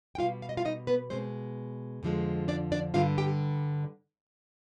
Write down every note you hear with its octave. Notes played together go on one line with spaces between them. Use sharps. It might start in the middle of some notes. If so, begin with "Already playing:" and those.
G5
B2 G3 F4 F5
F5
D#5
F4 F5
D#4 D#5
B3 B4
B2 G#3 C4 C5
F2 D3 F3 G#3
D4 D5
D4 D5
G2 D3 G3 F4 F5
G4 G5